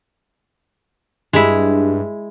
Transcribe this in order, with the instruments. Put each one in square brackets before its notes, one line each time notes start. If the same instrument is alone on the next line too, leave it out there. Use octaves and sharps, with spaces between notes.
[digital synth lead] G2 [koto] G#3 E4